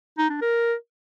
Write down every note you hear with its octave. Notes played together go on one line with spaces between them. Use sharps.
D#4
D4
A#4